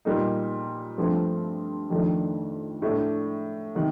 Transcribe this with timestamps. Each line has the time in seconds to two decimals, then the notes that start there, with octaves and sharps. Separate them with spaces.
0.05 A#2 G3 A#3 D#4
0.98 G2 F3 A3 C4
1.90 F2 D#3 A3 D4
2.82 A2 A3 D4
3.75 C3 D#3